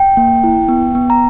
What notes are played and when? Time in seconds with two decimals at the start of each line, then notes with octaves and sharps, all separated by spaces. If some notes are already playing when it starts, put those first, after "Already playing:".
Already playing: G5
0.17 A#3
0.44 E4
0.69 B3
0.95 B3
1.10 A#5